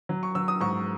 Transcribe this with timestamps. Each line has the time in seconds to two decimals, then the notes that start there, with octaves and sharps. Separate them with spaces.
0.09 F#3
0.23 C#6
0.35 F#3 E6
0.48 D#6
0.61 G#2 C#6